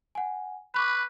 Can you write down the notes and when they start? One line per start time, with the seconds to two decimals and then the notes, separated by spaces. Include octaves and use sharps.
0.15 F#5 G#5
0.74 B4 B5 C#6 D6